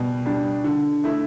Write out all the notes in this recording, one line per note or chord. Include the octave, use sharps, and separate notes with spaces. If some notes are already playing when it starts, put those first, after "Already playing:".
Already playing: B2 G3
G3 D4
D3
A3 E4